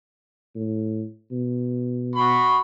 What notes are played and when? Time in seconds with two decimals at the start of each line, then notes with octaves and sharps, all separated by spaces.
0.55 A2
1.32 B2
2.15 F#4 B5 C#6